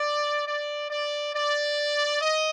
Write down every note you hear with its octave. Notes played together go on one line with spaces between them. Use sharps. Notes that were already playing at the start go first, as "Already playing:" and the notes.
Already playing: D5
D5
D5
D5
D#5